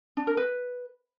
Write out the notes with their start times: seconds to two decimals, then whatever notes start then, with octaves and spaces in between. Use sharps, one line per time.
0.17 D4
0.27 A#4
0.37 B4